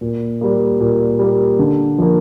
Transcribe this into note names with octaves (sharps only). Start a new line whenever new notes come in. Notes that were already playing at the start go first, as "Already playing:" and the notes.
A#2
G3 A#3
A#2
G3 A#3
D3
F3 A#3